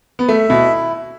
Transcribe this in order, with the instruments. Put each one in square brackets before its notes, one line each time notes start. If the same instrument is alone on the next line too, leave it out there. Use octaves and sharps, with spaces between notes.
[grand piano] B3
[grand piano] A3 [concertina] E5
[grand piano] B2 [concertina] E4